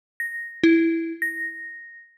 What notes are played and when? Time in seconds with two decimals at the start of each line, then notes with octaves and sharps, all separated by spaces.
0.20 A#6
0.63 E4
1.22 A#6